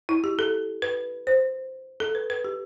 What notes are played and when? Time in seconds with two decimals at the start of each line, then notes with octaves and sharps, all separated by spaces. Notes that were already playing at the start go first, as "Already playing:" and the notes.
0.09 E4
0.24 G4
0.39 A4
0.82 B4
1.27 C5
2.00 A4
2.15 B4
2.30 B4
2.44 G4